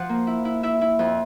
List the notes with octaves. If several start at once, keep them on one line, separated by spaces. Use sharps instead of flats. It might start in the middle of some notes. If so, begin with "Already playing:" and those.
Already playing: F3 F#5
A#3
E4
E4
E4 E5
E4
F2